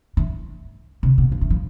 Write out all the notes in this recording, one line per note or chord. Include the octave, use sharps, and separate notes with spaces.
E3
C3
B2
F3
E3
F3